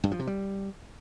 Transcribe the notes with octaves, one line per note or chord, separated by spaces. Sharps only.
G2
F3
C3
G3